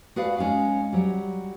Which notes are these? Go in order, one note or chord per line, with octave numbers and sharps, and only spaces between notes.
F#4 G#4 B4 D5 F5
G#3 C#4 D#4 F5
F#3 G3